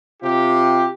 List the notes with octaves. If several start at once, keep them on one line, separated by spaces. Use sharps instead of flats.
C3 F4 G4